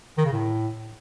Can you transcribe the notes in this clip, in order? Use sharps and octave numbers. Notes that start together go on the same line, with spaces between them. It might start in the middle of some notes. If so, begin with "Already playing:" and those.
D#3
C#3
A2